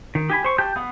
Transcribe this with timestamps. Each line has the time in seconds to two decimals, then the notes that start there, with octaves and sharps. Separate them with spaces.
0.15 D#3
0.30 G4 G#5 B5
0.44 C5 C#6
0.58 G4 G5 A5 G6
0.76 B3 F5 F#5